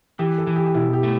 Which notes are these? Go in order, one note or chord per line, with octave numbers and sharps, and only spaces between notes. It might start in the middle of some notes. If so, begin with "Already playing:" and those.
E3 G4
A4
E3
G4
G4
B2 E4
G4
A3